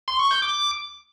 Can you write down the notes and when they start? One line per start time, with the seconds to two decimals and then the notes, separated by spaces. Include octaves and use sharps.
0.08 C6
0.19 C#6
0.31 G6
0.42 D6